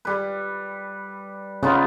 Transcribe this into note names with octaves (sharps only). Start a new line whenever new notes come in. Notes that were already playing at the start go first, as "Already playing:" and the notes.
G3 B4
C#3 B3 D#4 F4